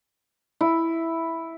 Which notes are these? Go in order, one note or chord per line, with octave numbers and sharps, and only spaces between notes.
E4